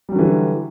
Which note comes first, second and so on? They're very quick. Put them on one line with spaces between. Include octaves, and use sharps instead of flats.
G3 F#3 D3 E3